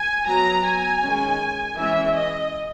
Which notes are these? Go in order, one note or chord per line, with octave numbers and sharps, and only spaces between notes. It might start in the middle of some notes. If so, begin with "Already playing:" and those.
Already playing: G#5
F#3 B3 A#5
G#5
D#3 G#3 C#4
E3 G#3 C#4 E5
D#5